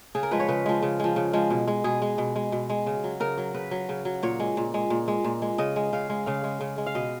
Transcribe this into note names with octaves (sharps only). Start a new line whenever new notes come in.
C#3 G#4
A#4
F3 G#3 B4
C#5
C#3 B4
F3 G#3
C#3
F3 G#3
C#3
F3 G#3
B2
G#3
B2 G#4
G#3
B2
G#3
B2
G#3
C#3
F#3
C#3 A#4
F#3
C#3 B4
F#3
C#3
F#3
A#2 C#5
G#3
A#2
G#3
A#2
G#3
A#2
G#3
C#3 D#5
G#3
C#3 F5
G#3
C#3 F5
G#3
C#3
G#3
F5
B2 D#5